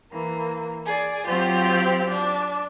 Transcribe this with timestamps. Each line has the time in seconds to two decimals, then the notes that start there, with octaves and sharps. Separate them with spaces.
0.12 E3 A#3
0.86 G#4 D5
1.27 F#3 C4 F4 G4
2.09 D4